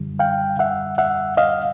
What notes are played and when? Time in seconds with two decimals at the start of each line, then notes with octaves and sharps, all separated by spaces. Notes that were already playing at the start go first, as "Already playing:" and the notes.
Already playing: F#2 D3 G3
0.19 F5 G5
0.59 E5 F#5
0.98 E5 F#5
1.37 D#5 F5